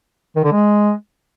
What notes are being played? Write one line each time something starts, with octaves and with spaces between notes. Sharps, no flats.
D#3
D3
G#3